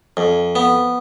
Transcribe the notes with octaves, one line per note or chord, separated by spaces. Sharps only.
F2
B3